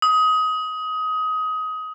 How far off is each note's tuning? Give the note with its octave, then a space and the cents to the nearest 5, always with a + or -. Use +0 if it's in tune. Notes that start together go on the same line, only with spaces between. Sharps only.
D#6 +20